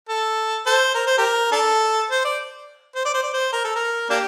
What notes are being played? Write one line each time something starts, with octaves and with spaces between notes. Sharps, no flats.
A4
A4 C5
A#4
C5
G4 A#4
D4 A4
C5
D5
C5
D5
C5
D5
C5
A#4
A4
A#4
A#3 D4 G4